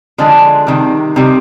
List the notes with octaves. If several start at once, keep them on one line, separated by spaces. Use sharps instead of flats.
D3 F3 G#3 D4 G#4
C3 D#3 G3
C3 D#3 G3